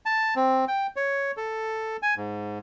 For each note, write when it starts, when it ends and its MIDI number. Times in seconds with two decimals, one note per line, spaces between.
0.06 0.34 81
0.36 0.65 60
0.68 0.87 79
0.96 1.31 73
1.37 1.97 69
2.02 2.14 80
2.17 2.59 44